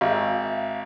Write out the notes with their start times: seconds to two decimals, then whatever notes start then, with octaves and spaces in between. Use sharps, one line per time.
0.01 G#1 E5 F5